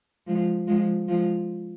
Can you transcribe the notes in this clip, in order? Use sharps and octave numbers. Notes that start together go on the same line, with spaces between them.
F3 G#3
F3 G#3
F3 G#3